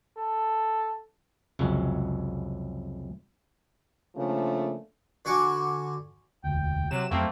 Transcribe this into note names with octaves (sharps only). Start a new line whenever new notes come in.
A4
C2 F2 C#3 F#3 G#3
C#3 F3 A3 A#3 D4
D3 F#4 G#5 C#6 D6
E1 D2 G5
C3 F#3 E7
F2 F#3 A3 A#3 C4